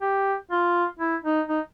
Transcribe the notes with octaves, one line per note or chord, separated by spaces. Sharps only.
G4
F4
E4
D#4
D#4